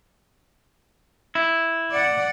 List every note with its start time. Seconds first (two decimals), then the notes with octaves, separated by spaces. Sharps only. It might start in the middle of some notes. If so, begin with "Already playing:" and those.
1.35 E4
1.92 D5 F#5